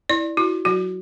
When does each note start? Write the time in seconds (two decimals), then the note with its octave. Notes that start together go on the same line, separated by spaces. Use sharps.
0.10 E4 D5
0.37 E4 F#4
0.65 F#3 F#4